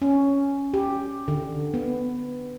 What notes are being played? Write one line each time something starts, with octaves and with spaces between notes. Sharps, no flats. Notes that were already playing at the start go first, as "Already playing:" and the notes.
C#4
G4
D3
B3